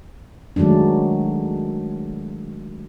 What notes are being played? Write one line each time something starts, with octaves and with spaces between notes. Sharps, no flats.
D#3 F#3 G#3 A3 D4